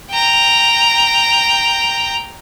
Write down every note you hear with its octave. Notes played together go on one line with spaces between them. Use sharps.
G5 A#5